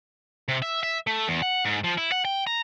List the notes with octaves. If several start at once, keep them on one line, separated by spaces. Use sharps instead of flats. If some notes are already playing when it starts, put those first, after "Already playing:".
C3
E5
E5
A3
E2
F#5
G#2
F3
E4
F#5
G5
A#5